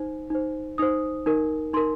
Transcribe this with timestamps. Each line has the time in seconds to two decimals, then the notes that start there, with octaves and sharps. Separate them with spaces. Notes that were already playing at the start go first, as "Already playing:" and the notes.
Already playing: D#4 C5
0.30 D#4 C5
0.78 D#4 C5 D#6
1.26 D#4 A#4
1.73 D#4 A#4 C6